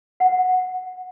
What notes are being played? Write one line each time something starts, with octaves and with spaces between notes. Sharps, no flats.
F#5